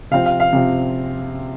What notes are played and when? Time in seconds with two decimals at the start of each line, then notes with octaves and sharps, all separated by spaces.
0.11 C3 F3 C4 F5
0.26 F5
0.40 F5
0.53 C3 F3 C4